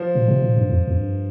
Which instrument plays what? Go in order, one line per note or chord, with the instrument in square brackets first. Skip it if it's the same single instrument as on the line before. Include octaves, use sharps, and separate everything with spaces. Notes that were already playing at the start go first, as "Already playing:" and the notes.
Already playing: [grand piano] F3
[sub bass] A#2
C3
A#2
G2
F2
F2
G2